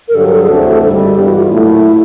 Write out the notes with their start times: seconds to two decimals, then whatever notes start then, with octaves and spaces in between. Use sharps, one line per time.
0.08 A#4
0.14 G2 D3 F#3 A4
0.43 G#4
0.48 D2 C3 E3 A3 D4 A4
0.82 G#1 G2 D3 G3 A4
1.15 G2 E3 G3 B3 G4
1.26 F#4
1.38 F4
1.49 A#2 F#3 A3 E4